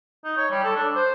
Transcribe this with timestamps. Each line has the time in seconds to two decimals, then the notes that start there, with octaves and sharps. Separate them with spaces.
0.25 D#4
0.37 C#5
0.51 G3
0.63 A4
0.76 D4
0.95 C5